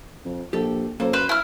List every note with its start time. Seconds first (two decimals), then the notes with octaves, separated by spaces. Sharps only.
0.25 F2
0.53 A#1 G4 A4
1.00 F#2 A#3 A4 C5
1.13 B4 C5 F5
1.29 E4 F6